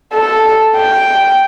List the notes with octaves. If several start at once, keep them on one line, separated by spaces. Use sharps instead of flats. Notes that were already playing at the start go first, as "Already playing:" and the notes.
A4
G5